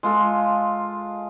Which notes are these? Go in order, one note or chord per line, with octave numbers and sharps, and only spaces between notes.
G#3 F4 A4